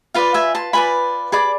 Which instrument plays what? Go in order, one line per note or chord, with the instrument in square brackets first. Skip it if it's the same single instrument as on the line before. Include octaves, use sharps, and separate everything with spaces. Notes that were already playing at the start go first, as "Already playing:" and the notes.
[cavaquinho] F4 B4 D5 F5
E5 G#5
A5 C6
F4 B4 D5 G#5 B5
G#4 D5 B5 D6